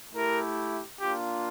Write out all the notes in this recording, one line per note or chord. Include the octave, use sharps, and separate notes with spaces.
A3 E4 G4 A#4
A#3 D4 F4 G4